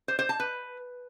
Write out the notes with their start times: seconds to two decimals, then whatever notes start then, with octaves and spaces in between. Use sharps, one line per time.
0.08 C5
0.19 C5
0.29 A5
0.40 B4